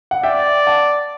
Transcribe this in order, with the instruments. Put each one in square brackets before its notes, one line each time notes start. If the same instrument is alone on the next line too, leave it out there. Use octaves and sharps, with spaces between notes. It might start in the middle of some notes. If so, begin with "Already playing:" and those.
[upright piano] F#5
[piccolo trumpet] D5 [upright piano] E5 G5
[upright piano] F#5 A5